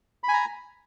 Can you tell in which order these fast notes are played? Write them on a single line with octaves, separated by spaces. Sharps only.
B5 G#5 A#5